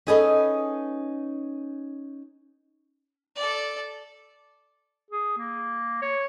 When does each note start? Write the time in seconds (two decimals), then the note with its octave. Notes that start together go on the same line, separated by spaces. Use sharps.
0.07 C#4 D#4 G#4 A4 B4 D#5
3.36 A4 D5
5.11 G#4
5.37 A#3
6.02 C#5